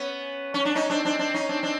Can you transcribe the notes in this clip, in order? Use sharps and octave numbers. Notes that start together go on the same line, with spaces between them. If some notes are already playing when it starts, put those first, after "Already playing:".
Already playing: B3 C#4
C#4
D4
C#4 D#4
C4 D4
C4 D4
C4 D4
C#4 D#4
C4 D4
C4 D4